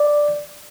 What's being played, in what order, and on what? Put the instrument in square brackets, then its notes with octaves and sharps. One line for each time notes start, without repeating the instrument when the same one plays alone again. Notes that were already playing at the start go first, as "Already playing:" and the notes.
Already playing: [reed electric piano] D5